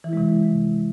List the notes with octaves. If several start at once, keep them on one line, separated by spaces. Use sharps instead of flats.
C3 E3 G#3 E4